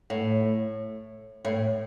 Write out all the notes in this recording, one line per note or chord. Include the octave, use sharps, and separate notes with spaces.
A2
A2